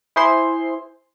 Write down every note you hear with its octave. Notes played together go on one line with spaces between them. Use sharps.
E4 G#4 C5 C6